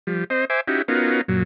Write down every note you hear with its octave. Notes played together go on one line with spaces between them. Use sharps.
F3 G3
C4 C5 D#5
C5 E5 G#5 D6
C#4 D#4 E4 F#4 G4
B3 C#4 D#4 F4 F#4 A#4
F#2 A#2 F#3